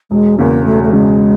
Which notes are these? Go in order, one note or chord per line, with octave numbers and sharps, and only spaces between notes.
E1 G#3
E2 C#3 A#3
E1 A3
A3
E2 C#3 G#3